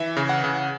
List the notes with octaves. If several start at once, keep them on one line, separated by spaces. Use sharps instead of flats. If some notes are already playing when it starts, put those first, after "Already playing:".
Already playing: E3 E5
C#3
F#5
C#3